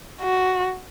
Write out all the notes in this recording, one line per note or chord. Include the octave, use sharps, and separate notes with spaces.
F#4